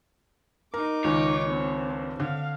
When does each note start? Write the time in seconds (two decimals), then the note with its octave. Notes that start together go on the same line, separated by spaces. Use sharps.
0.74 D#4 A#4 D6
1.04 C#2 D#3 C#5
1.49 C4 D4
2.20 D3 F5